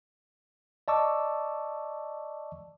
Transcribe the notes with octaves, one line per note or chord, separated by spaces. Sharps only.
D5 D#5 A5 C#6 D6 E6